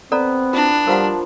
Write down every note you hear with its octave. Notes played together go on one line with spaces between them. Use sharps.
B3 C4 A4 D5 A#5
D4 E4 F4
F3 G3 A#3 A#4 F5 F#5 B5